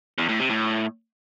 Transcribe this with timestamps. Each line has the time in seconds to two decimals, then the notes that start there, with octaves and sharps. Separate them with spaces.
0.18 E2
0.29 A2
0.39 C3
0.50 A2